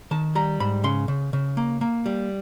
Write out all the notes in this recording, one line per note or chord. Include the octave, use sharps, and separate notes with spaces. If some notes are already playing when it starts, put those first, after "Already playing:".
D#3 A5
G3 A#5
G#2 B5
C#3 C6
C#3
C#3
A#3
A#3
G3